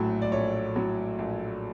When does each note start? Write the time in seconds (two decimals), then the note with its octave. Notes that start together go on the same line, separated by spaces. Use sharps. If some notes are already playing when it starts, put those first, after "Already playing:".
Already playing: A#1 A2 F#3
0.22 D5
0.31 A#1 C#5
0.75 A2 F#3
1.19 A#1